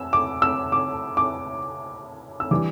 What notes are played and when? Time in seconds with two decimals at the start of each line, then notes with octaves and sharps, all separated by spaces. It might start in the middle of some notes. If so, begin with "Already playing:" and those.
Already playing: E6
0.13 D6
0.42 E6
0.72 D6
1.17 D6
2.40 E6
2.51 E3 G3 D4 D6